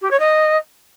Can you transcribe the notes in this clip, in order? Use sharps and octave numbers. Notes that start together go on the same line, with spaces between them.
G4
C#5
D#5